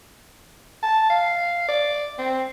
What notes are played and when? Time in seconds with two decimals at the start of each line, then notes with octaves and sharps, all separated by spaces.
0.83 A5
1.10 F5
1.68 D5
2.19 C4